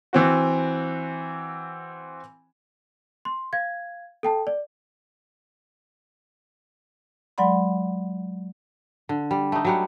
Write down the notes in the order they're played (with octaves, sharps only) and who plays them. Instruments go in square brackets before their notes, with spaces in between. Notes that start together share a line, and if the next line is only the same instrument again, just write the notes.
[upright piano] E3 C4 F#4
[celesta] C6
F5 G#6
A4 G5 A5
D5
[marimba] F#3 G#3 D5 F#5 B5 C6
[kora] D3
G3
A3 D#4
F#3 G3 F#5